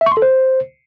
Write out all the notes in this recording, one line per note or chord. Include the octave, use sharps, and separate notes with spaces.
E5
C#6
C6
A4
C5